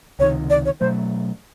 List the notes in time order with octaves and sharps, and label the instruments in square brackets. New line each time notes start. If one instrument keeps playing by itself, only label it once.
[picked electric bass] C#2 C3 D#3 [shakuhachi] C#5
[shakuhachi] D5
C#5
[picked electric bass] B2 F#3 A3 [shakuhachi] C5